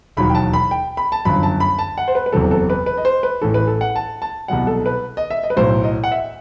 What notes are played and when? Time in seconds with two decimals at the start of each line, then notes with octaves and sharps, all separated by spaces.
0.17 E1 D#2 D#3 F#3 B5
0.30 G5
0.35 A5
0.53 B5
0.71 G5
0.97 B5
1.12 A5
1.25 G1 F#2 F#3 B5
1.43 A5
1.60 B5
1.79 A5
1.98 F#5
2.08 C5
2.15 B4
2.26 B4
2.32 F#1 E2 C3 F#3 A4
2.51 A4
2.70 B4
2.86 B4
2.97 D#5
3.05 C5
3.23 B4
3.42 A1 A2 E3 A4
3.54 B4
3.67 A4
3.81 F#5
3.96 A5
4.22 A5
4.48 C2 B2 F#3 F#5
4.67 A4
4.86 B4
5.17 D#5
5.30 E5
5.44 D#5
5.50 B4
5.57 B1 A2 F#3 C5
5.84 D#5
6.04 F#5
6.12 E5